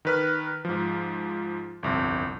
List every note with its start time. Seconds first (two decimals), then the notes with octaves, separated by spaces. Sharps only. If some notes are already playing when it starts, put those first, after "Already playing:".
0.05 D#3 B4 F6
0.65 G#2 F3
1.83 G1 C2 F2